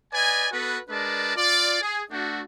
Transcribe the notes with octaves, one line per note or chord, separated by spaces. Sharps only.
B4 D5 D#5 G#5
B3 F#4 A4 B4
G#3 D4 A#4 B4 D5 A5
F4 D5
G#4
A3 D4 F#4